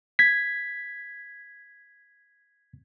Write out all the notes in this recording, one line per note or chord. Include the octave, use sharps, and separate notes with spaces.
G#6 B6